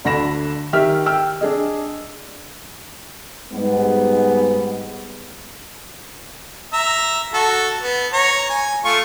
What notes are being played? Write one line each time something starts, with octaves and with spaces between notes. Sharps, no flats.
D2 D3 B5 A#6 E7
D#3 G4 E5 F6
G5 E6 F6
D4 G#4 D#5
G#2 G3 B3
E5 A#5
F#4 A4
B3
C#5 A#5
G#5
A3 F4 C#6